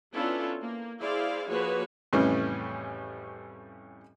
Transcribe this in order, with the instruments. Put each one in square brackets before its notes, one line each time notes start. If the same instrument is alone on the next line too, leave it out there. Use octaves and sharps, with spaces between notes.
[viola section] B3 C#4 D4 E4 F4 A4
A#3
E4 G#4 C5 D5 F5
F3 A#3 F#4 G#4 B4 C#5
[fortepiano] F2 A2 C#3 E3 G3 C#4